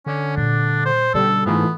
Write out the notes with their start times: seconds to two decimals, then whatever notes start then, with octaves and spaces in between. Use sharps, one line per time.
0.06 D3 C#4
0.36 A#2 G3 D4
0.86 C5
1.14 B2 D3 G3 C#4 A4
1.46 G#2 E3 A3 B3 F4